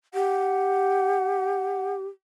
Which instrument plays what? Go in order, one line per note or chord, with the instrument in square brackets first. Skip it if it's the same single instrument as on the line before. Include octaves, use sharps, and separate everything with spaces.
[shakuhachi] G4 [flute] F#5